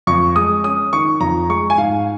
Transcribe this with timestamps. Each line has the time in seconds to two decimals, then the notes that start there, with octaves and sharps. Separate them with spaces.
0.07 F2 C#6
0.36 G#3 D#6
0.64 C#4 D#6
0.93 D#3 C#6
1.20 F2 A#5
1.49 G#3 C#6
1.70 G#5
1.78 G#2 F5